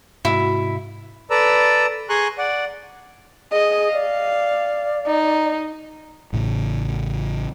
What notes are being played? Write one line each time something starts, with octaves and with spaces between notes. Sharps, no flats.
G#2 C3 E4 F#4
A4 B4 D5 A#5 E6
G#4 G#5 A#5 C6 C#6 F#6
D5 F#5
G#4 D#5
D5 F5
D#4
A1 A2 C#3